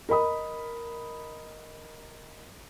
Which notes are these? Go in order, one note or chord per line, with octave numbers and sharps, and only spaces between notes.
A#4 D#5 B5 D#6